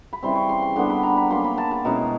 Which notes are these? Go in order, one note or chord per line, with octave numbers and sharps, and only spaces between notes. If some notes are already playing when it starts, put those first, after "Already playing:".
B5
C#3 E3 G3 C4 C6
C#6
C6
C6
D3 G3 B3 D4 C6
B5
A#5
B5
F#3 A#3 C#4 C6
B5
A5
A5
B2 G#3 C#4 E4 A#5